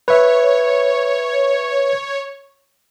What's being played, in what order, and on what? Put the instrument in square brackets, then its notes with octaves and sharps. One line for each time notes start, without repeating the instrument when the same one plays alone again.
[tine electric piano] B4 E5 [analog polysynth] C#5